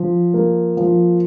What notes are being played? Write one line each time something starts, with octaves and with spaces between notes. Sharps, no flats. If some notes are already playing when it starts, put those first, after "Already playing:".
Already playing: F3
A#3
F3